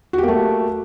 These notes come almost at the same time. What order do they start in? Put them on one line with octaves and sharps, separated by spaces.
F#4 G4 A#3 A3